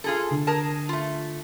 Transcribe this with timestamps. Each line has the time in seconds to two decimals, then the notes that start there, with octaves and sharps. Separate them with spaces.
0.04 F4 G#4 A4
0.31 D3
0.47 G#4 A#4 A5
0.89 A3 F4